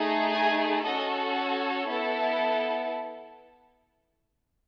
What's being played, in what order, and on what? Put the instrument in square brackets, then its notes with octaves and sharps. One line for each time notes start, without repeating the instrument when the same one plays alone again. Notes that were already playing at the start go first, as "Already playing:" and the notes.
Already playing: [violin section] A3 D#4 G#4
G#5
C#4 F#4 A4 D#5
C#5
B3 E4 A4